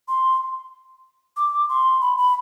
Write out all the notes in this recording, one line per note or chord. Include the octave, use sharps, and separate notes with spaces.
C6
D6
C6
B5
B5